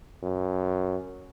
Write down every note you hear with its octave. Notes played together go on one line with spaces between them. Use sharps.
F#2